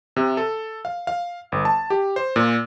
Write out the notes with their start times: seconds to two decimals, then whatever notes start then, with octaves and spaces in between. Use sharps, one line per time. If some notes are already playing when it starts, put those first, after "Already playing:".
0.16 C3
0.37 A4
0.85 F5
1.07 F5
1.52 G1
1.65 A5
1.90 G4
2.16 C5
2.36 A#2